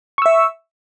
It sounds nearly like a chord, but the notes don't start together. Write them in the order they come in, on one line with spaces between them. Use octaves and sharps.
C#6 E6 E5